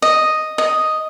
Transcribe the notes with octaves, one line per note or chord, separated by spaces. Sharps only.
D#5
D#5